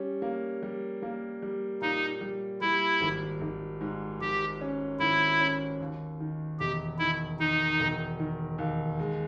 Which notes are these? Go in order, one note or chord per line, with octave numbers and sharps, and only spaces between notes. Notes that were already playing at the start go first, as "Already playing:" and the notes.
Already playing: G3 C#4
A#3
G3
A#3
G3
A#2 D#4
G3
G3 E4
G#1
G#1
G#2
G#1 G4
C#4
G#1 E4
C#4
D#2
D#3
E1 G4
D#3 E4
D#3 D#4
E1
D#3
D#2
G#3